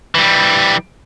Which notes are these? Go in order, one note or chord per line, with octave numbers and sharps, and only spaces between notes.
E3 G3